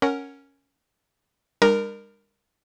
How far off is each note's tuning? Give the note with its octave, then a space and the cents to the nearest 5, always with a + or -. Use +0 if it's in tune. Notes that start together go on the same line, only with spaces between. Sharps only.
C#4 +0 A#4 +0 F#5 +0
G3 +45 D4 +40 A#4 +0